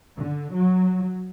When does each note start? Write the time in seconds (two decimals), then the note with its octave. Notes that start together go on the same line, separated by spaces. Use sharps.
0.18 D3
0.55 F#3